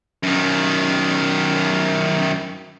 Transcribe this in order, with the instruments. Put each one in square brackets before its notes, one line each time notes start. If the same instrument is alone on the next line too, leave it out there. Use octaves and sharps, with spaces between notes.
[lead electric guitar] F#2 D#3